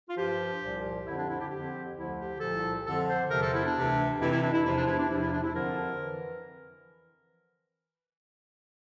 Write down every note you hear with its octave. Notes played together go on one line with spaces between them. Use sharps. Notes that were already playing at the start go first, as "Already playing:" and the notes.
F4
G2 F3 G4
C2 A#2 F3
F2 D3 F3 E4
D4
E4
G4
F2 D3 F3 G4
D2 D3 F3 E4
G4
C2 A#2 F3 A4
F2 D3 F3 A4
C5
E2 C3 F3 A#4
A4
E4
D4
D2 C3 E3
F2 C3 E3 E4
E4
D4
E4
E2 C3 F3 E4
D4
E4
D4
E2 C3 F3 E4
E4
D4
E4
F2 D3 F3 A#4
E3